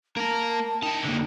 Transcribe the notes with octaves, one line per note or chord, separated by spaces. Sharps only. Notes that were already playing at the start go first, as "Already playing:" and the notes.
A#3 A#4 A5 A#5
D#4 E4 G5 A5
D3 A#3